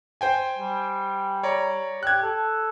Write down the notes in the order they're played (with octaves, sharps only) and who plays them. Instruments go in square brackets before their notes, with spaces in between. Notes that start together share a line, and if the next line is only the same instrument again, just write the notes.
[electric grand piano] C5 G5 G#5
[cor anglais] G3
[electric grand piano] C#5 D5 A#5
[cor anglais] G4 [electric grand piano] F#6 G#6
[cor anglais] A4